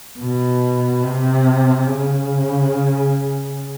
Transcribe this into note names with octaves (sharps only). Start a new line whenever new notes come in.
B2
C3
C#3